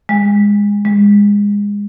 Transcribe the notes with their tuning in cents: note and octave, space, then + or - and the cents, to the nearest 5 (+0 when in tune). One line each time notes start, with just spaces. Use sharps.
G#3 -20
G#3 -25